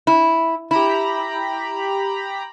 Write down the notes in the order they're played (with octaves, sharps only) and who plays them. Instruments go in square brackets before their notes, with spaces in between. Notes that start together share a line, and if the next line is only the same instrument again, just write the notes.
[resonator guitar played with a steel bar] E4
[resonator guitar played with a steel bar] E4 [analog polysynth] G4 A#5 B5